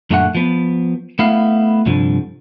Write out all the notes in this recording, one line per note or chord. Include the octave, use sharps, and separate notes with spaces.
F#2 A#2 D3 A3 A#4 F#5
F3 B3
A3 B3 E4 F5
C2 G2 D3 F3